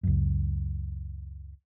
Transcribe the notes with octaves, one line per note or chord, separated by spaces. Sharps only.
C#2 F#2